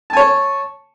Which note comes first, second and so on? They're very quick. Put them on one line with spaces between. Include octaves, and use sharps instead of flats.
A5 G#5 C#5